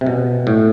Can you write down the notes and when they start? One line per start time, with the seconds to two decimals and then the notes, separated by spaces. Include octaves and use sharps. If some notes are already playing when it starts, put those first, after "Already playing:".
0.01 C3
0.06 B2
0.47 A2